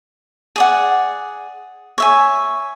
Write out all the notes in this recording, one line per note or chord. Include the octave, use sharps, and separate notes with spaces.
G#4 D5 F#5
C#5 E5 G#5